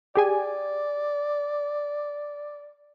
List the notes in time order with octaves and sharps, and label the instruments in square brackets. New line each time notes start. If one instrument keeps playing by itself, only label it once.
[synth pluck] G4 G#4 G#5 [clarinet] D5